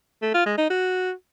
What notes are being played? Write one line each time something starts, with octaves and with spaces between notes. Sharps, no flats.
A3
F4
G#3
D#4
F#4